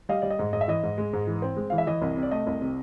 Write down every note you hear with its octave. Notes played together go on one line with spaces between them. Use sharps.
G3 D#5 F5
G3 D5
D#5
G#2
G#2 D#5
E5
E3 D#5
G#2
G#3
G#2
E3
C4
G#3
E3 F5
E5
E3 D#5
C2
C3
D5
A3 D#5
C2
C3